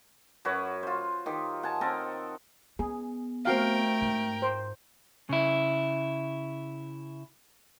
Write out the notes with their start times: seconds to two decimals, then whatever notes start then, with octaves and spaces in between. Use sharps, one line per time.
0.45 F#2 F#4 B4 C#5
0.83 F4 C5
1.26 D#3 G4
1.63 F#5 G#5 A5
1.81 C4 A4 A#4 D#5
2.79 B3 G#4
3.45 A3 C4 F#4 A#4 F5 G5
4.01 G#2
4.42 C5
5.29 C#3 E4